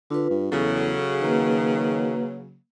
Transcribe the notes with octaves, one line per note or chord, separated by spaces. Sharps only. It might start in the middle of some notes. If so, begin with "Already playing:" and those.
D3 F4 B4
G2
E2 C#3 F#3 A4
D#3 A#3 B4